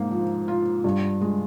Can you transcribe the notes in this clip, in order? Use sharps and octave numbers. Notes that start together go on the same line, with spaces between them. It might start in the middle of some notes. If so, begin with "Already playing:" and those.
Already playing: G#2 A#3
F3
F4
G2
G#3